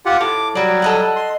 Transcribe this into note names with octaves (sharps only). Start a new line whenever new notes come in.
F4 G4 F#5
A2 D6
F#3 G3 F#4 D5
A4 D#5 F#5
C6